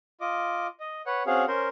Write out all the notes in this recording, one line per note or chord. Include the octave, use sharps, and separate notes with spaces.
F4 D#5 D6
D#5
B4 C#5 F#5
C4 C#4 F#4 G#4 F5
C#4 A#4 C5